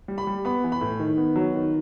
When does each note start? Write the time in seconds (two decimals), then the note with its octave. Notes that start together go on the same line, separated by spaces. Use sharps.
0.08 G3
0.18 B5
0.27 G3
0.45 B3 B5
0.64 E3
0.72 B5
0.81 A2
0.99 D#3
1.17 B3
1.36 F#3
1.55 D#3